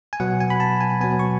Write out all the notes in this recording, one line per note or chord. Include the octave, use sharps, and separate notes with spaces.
G#5
B2 F#3 B3 F#5
G#5
B5
A5
G#5
B2 F#3 B3 G#5
C#6